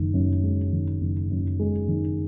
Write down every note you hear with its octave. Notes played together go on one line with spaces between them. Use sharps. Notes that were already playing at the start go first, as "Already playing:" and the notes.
Already playing: F#1 D#3
F#2
G#3
D#3
F#1
F#2
G#3
D#3